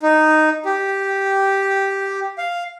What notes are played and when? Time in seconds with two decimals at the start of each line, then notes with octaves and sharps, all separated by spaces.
0.02 D#4
0.65 G4
2.38 F5